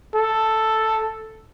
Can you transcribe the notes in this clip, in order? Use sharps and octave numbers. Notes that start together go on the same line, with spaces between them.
A4